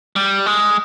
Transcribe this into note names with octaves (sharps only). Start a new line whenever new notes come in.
G3
G#3